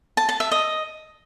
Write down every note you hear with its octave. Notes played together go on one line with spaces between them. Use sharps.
A5
A5
E5
D#5